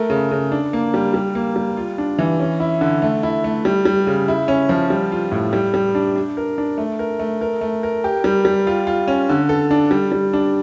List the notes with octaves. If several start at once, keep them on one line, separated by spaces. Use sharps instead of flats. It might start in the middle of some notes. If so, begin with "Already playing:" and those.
Already playing: A3 A#4
C#3
C#3
D4
A#3
G3
G3
A#3
G3
F4
D4
E3
C#4
E4
D3
A3
E4
A3
G3
G3
C#3
E4
C#4
F3
G3
F4
A2
G3
G3
D4
D4
A#4
D4
A3
A#4
A3
A#4
A3
A#4
G4
G3
G3
F4
F4
C#4
D3
A4
D4
G3
G3
D4